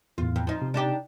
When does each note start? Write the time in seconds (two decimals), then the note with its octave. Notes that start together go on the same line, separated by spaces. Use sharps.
0.18 E2 A2 F4
0.36 F2
0.47 F3 D#4
0.62 C3
0.74 D4 D#4 G4